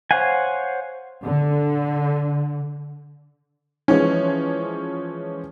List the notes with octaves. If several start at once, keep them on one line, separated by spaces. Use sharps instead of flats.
C5 C#5 F5 F#5 G#5
D3
E3 F3 G#3 C#4